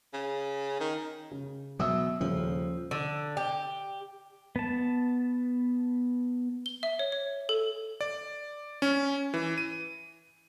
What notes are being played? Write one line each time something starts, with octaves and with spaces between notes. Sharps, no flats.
C#3
D#3
C#3
B2 F#3 E5 D#6 E6
D#1 C#3 F3
D3
G4
B3 A5
G7
E5
C#5
C#5
A4
D5
C#4
E3
D#7